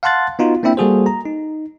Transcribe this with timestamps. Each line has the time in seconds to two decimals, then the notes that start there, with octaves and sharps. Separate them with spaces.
0.03 F5 F#5 A5 C6 F#6 A6
0.39 B3 D#4 F4 F#4
0.63 A#3 C4 D4 E4 E5 G5
0.77 G3 A#3 F#4 G#4 A4 C5
1.06 A#5
1.26 D#4